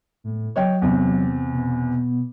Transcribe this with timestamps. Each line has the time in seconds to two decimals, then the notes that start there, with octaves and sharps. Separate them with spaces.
0.24 A2
0.56 F#3 C#5 D#5 G5
0.82 E2 C3
1.53 B2